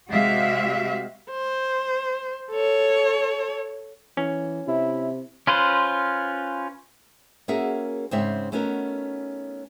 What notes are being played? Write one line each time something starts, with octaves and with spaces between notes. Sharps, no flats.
C3 G#3 F#4 G4 E5 F5
C5
A4 C#5
E3 C#4
C3 E4 E5
C#4 F4 B4 C5
A#3 C#4 F#4 G#4 A#4 E5
G#2 C#3 C4 C#5 E5
A3 B3 C#4 D#4 F#4 A#4